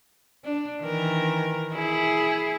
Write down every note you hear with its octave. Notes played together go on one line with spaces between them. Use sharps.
D4
D#3 E3 A#4
E4 G#4